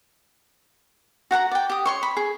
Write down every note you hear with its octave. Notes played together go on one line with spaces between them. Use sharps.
F#4 F#5 A5 A#5
D5 G5
G4 D#6
C#5 C6 C#6
B5
G#4